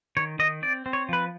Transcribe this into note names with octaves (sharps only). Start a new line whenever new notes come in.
D#3 C#5
D#3 D#5
C4 D5
C4
C#5
F3 B4